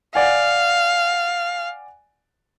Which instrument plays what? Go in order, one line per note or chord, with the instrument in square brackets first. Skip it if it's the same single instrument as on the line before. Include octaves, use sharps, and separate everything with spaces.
[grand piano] D5 F#5 G#5 [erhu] F5